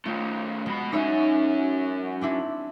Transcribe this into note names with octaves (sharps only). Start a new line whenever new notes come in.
D#3 A3 F4
B2 G#3 B5
F#2 C#4 D#4 C#5 E5
C4 D4 E4